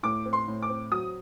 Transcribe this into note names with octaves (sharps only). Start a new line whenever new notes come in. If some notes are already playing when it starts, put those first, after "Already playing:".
A2 D6
C4
C6
A2
D6
C4
F#3 D#6